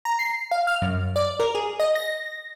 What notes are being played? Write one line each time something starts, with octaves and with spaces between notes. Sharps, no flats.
A#5
C7
F5
F6
F#2
D5
A#4
G#4
D#5
A#6